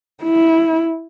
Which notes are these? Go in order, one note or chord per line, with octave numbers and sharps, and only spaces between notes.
E4